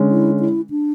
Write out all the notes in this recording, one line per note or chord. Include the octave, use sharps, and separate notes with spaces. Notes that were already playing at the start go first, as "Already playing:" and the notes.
Already playing: D3 G#3 C#4
E4
E4
D4